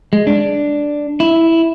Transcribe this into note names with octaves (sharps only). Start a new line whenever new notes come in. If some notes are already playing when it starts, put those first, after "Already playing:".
G#3
D4
E4